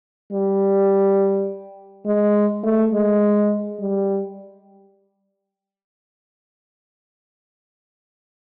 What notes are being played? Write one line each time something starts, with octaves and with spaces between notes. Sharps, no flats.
G3
G#3
A3
G#3
G3